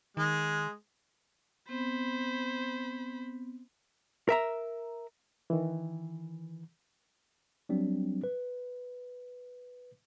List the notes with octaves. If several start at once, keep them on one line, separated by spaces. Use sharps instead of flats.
D#3 G#3
B3 C4 C5 B5
A#4 E5 A#5
D#3 E3
F#3 G3 C4 D4
B4